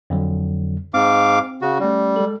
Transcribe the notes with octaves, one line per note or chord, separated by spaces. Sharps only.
F2 D3 F#3
G#2 C4 F5 D6
C#3 F#4
G3 A3 C#4
G#3 A4